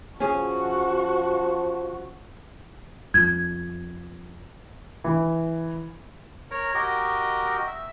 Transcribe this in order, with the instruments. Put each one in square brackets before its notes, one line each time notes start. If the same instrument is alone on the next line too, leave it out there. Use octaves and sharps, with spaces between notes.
[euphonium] F3 [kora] C#4 G#4 [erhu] F#4
[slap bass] F2 [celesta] G#6
[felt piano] E3
[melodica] A#4 C#5 A#5
F#4 G4 A#4 D#5
E5